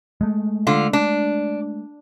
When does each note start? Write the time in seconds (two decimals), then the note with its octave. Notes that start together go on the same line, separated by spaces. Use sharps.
0.21 G#3 A3
0.67 D3 F4
0.93 D4